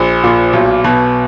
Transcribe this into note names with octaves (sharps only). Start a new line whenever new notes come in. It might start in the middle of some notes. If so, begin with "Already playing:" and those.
Already playing: A#1
A#2
B1
B2